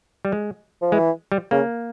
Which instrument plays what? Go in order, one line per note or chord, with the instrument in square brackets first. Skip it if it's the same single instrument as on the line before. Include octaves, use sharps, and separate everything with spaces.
[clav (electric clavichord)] G3
G#3
[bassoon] F3
[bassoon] E3 [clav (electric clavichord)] G#3
[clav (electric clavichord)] G3
[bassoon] C#3 [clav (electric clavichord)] A#3